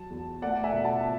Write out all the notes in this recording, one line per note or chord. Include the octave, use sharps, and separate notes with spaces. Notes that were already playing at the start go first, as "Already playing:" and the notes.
Already playing: F#3 A5
E2
A3 D5 F#5
E5 G#5
B2
F#5 A5